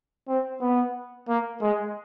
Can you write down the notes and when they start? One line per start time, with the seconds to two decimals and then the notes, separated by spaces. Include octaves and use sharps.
0.28 C4
0.61 B3
1.29 A#3
1.62 G#3